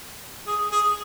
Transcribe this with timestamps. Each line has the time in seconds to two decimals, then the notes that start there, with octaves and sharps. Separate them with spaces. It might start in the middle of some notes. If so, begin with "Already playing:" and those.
0.47 G#4
0.72 G#4